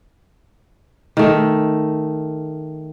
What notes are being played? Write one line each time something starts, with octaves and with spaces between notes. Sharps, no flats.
D#3 A3